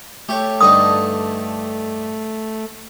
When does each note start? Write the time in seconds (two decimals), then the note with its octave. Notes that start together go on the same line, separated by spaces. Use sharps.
0.29 A3 G4 C#5
0.61 G2 D3 D#4 D#6